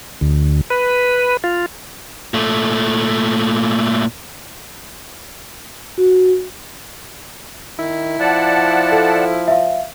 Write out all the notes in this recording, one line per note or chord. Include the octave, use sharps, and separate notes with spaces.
D2
B4
F4
A#2 A3
F#4
D#3 E4
F3 D5 F#5 A5
A4
E5 F5